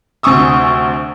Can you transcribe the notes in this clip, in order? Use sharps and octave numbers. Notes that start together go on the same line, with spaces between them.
D2 C3 G#5 C#6 D#6 E6